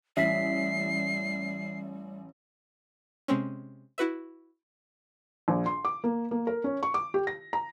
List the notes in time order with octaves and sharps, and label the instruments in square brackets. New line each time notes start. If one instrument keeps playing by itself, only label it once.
[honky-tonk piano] A1 [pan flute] G3 [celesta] E5 B6 [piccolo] C7
[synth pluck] C3 G#3 C4 C#4
E4 F#4 B4 E5
[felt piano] A#1
C6
D6
A#3
A#3
A#4
C#4
C#6
D6
G4
A#6
A#5